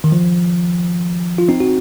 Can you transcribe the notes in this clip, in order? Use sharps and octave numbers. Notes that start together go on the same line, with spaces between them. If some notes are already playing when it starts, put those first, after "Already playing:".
D#3
F3
F4
C4 D#4
F#4